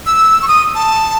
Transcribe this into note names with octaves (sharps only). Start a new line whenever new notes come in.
E6
C#6
D#6
A5